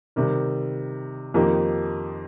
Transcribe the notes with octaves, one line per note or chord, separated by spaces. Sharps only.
C3 D#3 G3
F2 D#3 A#3 D#4 G4